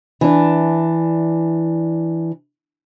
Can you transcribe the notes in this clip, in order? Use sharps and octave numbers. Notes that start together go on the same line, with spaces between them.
E3 D4